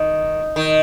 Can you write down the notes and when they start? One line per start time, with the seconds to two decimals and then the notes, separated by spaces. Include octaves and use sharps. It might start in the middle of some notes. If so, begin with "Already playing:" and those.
Already playing: D#3
0.56 D#3